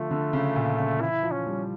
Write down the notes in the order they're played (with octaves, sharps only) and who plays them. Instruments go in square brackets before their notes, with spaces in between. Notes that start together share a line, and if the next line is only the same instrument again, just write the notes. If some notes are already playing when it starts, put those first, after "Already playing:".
Already playing: [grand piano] D3 F3 [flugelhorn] A3
[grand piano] D3
C#3
A#2
C#3
[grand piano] E3 [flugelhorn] E4
[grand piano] F3
[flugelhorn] C#4
[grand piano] G3